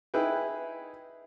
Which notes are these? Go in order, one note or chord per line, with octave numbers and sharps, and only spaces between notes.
D#4 E4 G#4 B4 G5